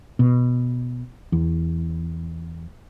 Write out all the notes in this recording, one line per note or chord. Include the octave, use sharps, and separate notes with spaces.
B2
E2